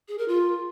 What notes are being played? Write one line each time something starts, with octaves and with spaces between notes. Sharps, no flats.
G#4
A#4
F4